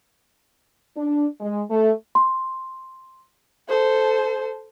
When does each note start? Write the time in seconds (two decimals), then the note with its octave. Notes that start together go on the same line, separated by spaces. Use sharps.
0.96 D4
1.41 G#3
1.70 A3
2.15 C6
3.69 A4 C5